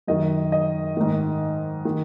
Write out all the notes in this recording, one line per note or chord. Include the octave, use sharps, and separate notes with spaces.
F#2 D#3 D#5
D#5
G#2 D#3
D#3